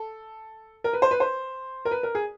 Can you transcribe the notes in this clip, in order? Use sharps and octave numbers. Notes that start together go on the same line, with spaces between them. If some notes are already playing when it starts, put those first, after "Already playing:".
Already playing: A4
A#4
B4
C5
B4
C5
A#4
B4
A#4
G#4